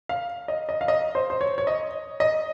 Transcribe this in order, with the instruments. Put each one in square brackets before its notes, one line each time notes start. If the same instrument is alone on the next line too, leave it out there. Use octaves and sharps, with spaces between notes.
[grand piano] F5
D#5
D#5
F5
D#5
C5
C5
C#5
C#5
D#5
D#5